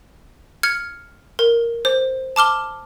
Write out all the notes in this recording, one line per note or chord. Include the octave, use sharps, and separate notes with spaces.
F6 G#6 C#7
A#4
C5
A5 D6 F6 G7